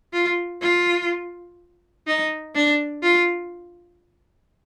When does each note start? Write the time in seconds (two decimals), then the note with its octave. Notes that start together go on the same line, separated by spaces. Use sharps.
0.13 F4
0.61 F4
2.07 D#4
2.55 D4
3.03 F4